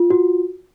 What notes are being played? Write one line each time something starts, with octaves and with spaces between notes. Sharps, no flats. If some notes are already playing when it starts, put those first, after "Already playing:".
Already playing: F4
F#4